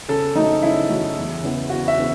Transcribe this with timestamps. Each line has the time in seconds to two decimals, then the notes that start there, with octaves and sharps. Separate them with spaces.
0.09 C#3 A4
0.35 F#3 A3 D#4
0.63 C#3 E4
0.90 F#3 A3
1.17 E2
1.43 C#3 E3 B3
1.70 E2 F#4
1.88 E5
1.97 C#3 E3 B3